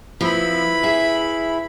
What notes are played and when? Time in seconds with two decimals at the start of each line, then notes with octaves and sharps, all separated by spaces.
0.21 F3 C4 E4 B4 B5
0.83 G#4 E5